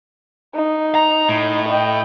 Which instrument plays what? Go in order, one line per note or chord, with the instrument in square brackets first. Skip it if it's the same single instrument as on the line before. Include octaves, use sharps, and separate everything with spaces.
[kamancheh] D#4
[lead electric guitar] A#5
A2
[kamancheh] D#5 G5